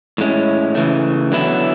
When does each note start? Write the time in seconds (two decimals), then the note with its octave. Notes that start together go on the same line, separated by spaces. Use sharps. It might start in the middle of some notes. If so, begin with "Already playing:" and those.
0.18 A2 G#3 C#4 E4
0.75 C#3 E3 A3
1.32 D3 F#3 B3 E4